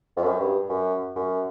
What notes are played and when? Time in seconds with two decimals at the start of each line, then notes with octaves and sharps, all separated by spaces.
0.16 F2
0.24 F#2
0.39 G2
0.69 F#2
1.16 F#2